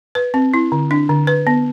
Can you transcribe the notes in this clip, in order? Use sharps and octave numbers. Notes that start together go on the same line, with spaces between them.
B4
C4
E4
D3
D4
D3
B4
B3